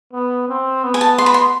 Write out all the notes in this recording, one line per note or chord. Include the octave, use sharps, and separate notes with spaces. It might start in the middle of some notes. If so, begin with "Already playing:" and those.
B3
C4
B3
G#5
A5
C6
B5
C6